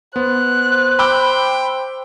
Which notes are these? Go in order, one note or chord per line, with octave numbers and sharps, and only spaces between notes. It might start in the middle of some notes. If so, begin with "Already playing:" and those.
B3 C5 F#6
G5 B5 D6 E6